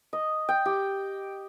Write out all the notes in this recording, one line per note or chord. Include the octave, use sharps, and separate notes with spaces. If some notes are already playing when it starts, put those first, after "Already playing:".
D#5
G5
G4